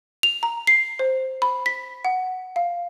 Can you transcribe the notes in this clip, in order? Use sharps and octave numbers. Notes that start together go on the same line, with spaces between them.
F7
A#5
C7
C5
B5
B6
F#5
F5